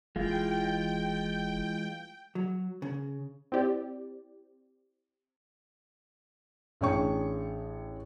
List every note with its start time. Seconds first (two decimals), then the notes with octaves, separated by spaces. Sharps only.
0.16 F1 E3 G#3 F4 G5
2.35 F#3
2.82 C#3
3.52 C4 E4 G4 D5
6.81 A1 D4 G#4 C#5 G5 C#6